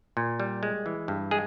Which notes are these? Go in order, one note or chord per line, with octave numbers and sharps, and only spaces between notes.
A#2
G3
G#3
E3
G2
G#3 G#4